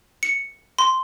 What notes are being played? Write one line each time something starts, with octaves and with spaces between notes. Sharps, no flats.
C#7
C6